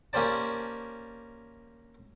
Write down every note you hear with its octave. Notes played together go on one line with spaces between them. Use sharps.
A#3 C#4 G4 C5 D5 A5